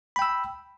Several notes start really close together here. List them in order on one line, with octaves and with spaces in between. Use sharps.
B5 G5 E6